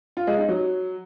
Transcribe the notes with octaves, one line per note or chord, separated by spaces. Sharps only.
F4
G#3
D#4
F#3